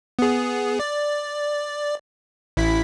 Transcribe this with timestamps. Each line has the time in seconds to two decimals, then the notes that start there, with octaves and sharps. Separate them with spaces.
0.19 B3 G#4
0.80 D5
2.57 A1 E4 B6